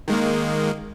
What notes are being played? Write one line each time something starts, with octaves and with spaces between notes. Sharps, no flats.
D#3 G#3 A#3